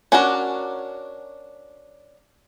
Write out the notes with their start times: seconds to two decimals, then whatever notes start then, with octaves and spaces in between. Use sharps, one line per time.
0.12 C#4 D4 F#4 A#4